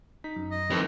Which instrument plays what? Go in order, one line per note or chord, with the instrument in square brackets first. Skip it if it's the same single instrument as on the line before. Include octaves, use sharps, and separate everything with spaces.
[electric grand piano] D#4 [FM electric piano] B6
[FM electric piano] F#2
[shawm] D#5
[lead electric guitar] F2 [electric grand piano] A2 D#3 [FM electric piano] G3 B4 C7